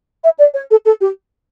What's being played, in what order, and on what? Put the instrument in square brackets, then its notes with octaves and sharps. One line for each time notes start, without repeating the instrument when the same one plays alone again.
[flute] E5
D5
C#5
A4
A4
G4